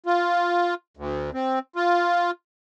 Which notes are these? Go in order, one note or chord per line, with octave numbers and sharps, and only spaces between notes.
F4
D2
C4
F4